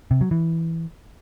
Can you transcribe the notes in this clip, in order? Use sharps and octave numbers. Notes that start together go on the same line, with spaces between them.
C3
F#3
E3